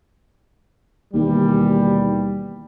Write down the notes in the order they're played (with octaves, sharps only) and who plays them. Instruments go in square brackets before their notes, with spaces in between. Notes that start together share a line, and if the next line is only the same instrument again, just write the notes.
[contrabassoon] D#2 [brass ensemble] B2 E3 G3